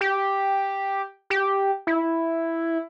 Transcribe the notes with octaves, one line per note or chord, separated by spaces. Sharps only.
G4
G4
E4